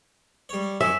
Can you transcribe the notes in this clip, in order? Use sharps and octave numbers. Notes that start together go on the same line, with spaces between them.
G3 C#5
F#2 D#3 E5 G#5